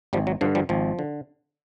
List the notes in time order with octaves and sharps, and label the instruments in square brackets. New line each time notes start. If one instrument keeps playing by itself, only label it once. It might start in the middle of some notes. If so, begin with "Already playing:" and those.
[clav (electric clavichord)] G#1 F3 G3
F#3
G2 D3 F3
F3 G3
G#1 F3
D3